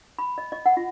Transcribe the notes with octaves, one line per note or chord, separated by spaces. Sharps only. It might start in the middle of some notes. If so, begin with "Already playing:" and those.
B5
D#5
D#5
F#5
F4